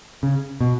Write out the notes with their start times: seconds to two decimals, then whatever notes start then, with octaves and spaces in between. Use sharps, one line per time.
0.23 C#3
0.61 B2